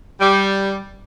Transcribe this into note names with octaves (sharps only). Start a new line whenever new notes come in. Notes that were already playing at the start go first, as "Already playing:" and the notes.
G3